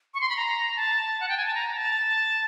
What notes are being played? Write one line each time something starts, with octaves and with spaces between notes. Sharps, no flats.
C#6
C6
B5
A#5
A5
F#5
G5
G#5
A5
A#5
A5